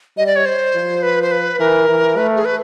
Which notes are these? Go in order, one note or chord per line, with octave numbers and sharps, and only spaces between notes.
G3 D#5
D5
C#5
C5
F3
B4
C5
B4
E3 A#4
E3
A3 B4
G#4
B4